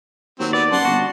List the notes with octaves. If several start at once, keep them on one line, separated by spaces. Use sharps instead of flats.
D#2 F#3 C4
B3 D5
F#2 F#5 A5 C6
G1 F#4